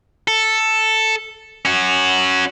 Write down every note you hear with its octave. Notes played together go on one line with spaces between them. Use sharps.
A4
C#4 F#4